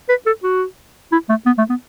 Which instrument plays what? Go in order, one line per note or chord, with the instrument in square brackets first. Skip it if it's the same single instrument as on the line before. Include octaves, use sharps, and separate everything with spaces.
[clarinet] B4
A4
F#4
E4
A3
B3
A3
B3